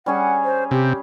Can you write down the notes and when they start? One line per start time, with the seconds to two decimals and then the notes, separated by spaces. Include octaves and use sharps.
0.06 G3 C#4 G#4 F#5
0.44 C5
0.71 C3 G4